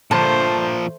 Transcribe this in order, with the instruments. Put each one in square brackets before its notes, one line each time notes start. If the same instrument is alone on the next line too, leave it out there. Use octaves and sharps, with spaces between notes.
[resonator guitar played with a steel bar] G2 D3 A5 [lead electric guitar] A#2 F3 [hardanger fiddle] A3 C5